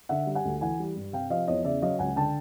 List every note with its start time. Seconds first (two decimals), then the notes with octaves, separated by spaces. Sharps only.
0.09 D3 E5 F#5
0.27 G3
0.35 F#5 G#5
0.45 D2
0.61 E3 F#5 G#5
0.79 G3
0.95 G2
1.13 C3 F5 G5
1.30 F3 D#5 F5
1.48 E2 C#5 D#5
1.65 C#3 D5 E5
1.82 F#3 D#5 F5
1.99 C#2 F#5 G#5
2.16 D3 G5 A5